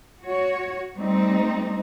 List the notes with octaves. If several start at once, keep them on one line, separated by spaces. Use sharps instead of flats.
F#4 C#5
G3 A3 C4 D#4